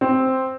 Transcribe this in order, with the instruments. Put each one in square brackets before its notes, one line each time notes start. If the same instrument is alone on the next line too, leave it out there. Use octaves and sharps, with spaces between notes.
[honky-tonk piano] C4